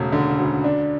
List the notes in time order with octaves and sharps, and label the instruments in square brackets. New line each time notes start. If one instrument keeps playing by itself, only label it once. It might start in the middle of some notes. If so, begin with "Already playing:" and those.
Already playing: [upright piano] E1 C#3 A3
D3
D2
D4